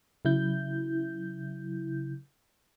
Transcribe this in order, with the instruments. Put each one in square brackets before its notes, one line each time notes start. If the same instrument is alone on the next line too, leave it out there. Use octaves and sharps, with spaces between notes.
[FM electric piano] C#3 F#3 E4 G6